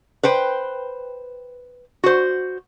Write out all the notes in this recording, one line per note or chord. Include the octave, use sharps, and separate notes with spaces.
B4 C5 G5
F#4 C5